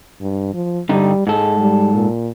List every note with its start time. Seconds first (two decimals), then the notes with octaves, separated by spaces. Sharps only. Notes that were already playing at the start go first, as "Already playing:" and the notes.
0.21 G2
0.54 F3
0.89 G2 D3 G3 D#4
1.27 G#2 G#3 A4
1.59 G3
1.94 A#2